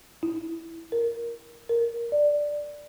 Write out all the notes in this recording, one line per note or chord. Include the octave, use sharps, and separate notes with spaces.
E4
A#4
A#4
D5